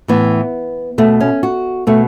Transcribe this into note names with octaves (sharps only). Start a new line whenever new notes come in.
A2 E3 B3
B2 A3
C#4
F#4
B2 A3